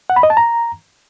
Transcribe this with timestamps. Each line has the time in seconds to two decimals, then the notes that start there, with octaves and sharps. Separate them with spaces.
0.10 F#5
0.16 B5
0.23 D#5
0.30 A5
0.37 A#5